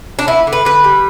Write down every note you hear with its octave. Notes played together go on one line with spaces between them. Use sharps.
D4
B3 E4
D3
B4
D3 B4
G3